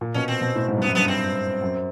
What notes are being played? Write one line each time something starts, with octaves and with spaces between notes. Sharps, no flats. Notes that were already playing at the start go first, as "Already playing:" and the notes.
A#2
B2 C#4
C4
B2
A2
G#2
G2 B3
F#2
G2 B3
C4
F#2